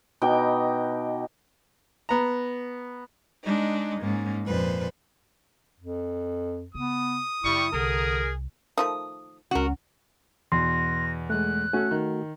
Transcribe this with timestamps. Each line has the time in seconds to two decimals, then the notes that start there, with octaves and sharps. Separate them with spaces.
0.22 B2 D#4 G5 D6
2.09 B3 A#5
3.45 G#3 D4 D#4
4.01 G#2 A#3 C#4
4.45 F2 A#2 B4 C5
5.80 F2
6.75 C#3 B3 D#6
7.44 F#2 C#3 G3 E4 C#6
7.73 C2 D3 G#4 A#4
8.78 D#3 F3 A3 D#6
9.51 C#2 C#4 F#4 A#4 F#5
10.52 E2 B2 C6 A#6
11.30 G#3 A3 F#6
11.73 A3 C#4 F#4 A4
11.91 D#3